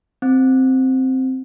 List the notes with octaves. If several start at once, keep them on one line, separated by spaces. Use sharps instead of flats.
C4